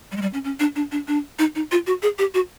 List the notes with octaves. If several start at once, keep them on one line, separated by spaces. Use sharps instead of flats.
G3
G#3
G3
C#4
C#4
D4
D4
D4
D4
D#4
D#4
F4
F#4
G#4
G4
F#4